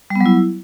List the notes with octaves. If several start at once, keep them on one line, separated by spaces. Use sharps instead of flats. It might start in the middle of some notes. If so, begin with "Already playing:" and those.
G3
B3
F#3
E4